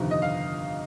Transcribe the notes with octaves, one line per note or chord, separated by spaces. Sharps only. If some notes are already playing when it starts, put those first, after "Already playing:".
Already playing: G1 F2 C3 D#3
D#5
F5